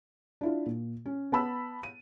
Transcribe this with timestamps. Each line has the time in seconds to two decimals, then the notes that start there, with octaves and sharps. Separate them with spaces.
0.41 D4 E4 F4
0.66 A#2
1.06 C#4
1.32 B3 A5 B5 E6
1.83 D#7